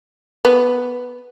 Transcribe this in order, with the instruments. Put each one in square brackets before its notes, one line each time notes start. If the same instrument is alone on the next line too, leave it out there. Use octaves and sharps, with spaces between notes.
[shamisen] B3